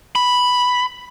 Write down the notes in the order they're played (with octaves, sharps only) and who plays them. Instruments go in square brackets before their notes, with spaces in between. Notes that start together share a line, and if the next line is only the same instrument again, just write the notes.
[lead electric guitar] B5